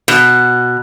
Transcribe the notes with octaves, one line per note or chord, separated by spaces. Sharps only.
B2